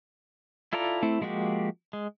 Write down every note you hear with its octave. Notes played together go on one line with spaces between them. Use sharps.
E4 F4 A4 D5 A#5
A3 C4 E4
F3 G#3 A#3 F#4 G4
G#3